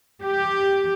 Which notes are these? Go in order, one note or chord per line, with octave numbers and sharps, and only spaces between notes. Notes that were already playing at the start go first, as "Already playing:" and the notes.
G4